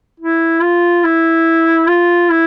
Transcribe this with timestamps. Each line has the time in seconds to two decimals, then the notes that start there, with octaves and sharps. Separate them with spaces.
0.20 E4
0.62 F4
1.04 E4
1.87 F4
2.30 E4